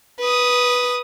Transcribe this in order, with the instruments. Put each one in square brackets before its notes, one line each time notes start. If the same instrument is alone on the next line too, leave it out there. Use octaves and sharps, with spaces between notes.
[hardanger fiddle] B4 D#6